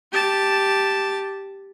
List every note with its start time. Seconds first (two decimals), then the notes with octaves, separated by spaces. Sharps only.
0.12 G4 A5